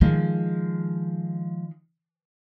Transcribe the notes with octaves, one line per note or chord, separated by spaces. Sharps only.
D#3 F3 G#3